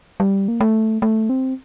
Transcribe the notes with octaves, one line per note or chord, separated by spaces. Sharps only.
G3
A#3
A3
A3
C4